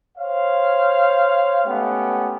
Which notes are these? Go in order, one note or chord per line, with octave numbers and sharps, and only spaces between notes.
C5 C#5 F5
G#3 A3 B3 C#4 G4